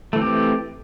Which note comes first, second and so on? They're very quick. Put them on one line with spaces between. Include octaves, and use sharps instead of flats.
A3 E3 C4 G4